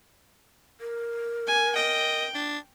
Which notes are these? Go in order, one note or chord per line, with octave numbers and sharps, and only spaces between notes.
A#4
G#5
D#5 G5
D4